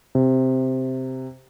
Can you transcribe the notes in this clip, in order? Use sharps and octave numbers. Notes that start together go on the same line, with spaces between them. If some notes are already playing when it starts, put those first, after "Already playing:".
C3